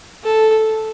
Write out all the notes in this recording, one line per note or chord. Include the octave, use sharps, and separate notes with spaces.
A4